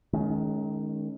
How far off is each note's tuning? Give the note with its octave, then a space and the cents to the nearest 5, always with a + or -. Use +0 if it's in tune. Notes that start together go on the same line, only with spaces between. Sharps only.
D#3 +0 G#3 +35 C#4 +20